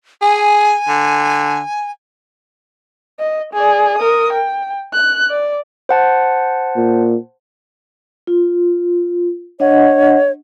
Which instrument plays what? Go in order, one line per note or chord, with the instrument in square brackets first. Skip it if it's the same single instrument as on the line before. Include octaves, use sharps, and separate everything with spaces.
[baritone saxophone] G#4 [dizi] G#5
[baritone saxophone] D3
[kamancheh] D#5
G#4 D5
A#4 D#6
G5
F#6
D5
[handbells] C5 F#5 A5
[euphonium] A#2
[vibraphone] F4
[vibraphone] D4 D#5 F#5 [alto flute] C#5